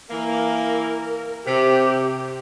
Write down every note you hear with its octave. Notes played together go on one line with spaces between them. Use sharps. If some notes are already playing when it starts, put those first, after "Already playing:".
E3 A#3 A#4
C3 G4